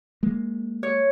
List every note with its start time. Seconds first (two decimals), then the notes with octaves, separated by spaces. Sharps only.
0.23 G#3 A#3
0.83 C#5